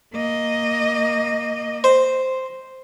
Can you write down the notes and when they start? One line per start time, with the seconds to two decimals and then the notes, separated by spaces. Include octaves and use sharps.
0.14 A#3 D#5
1.84 C5